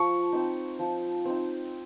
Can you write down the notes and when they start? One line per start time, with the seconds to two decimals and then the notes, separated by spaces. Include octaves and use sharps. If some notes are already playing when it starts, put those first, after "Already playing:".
Already playing: F3 C#6
0.33 C4 D#4
0.79 F3
1.25 C4 D#4